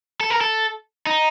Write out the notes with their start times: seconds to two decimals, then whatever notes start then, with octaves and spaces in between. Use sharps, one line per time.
0.21 A4
0.30 A#4
0.41 A4
1.07 D#4